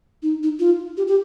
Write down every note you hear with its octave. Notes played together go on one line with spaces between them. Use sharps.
D#4
D#4
F4
G4
G4